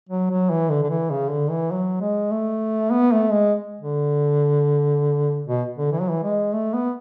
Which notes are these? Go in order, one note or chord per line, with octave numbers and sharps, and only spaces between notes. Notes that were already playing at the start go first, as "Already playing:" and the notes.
F#3
F#3
E3
D3
D3
E3
C#3
D3
E3
F#3
G#3
A3
B3
A3
G#3
D3
B2
D3
E3
F#3
E3
G#3
A3
B3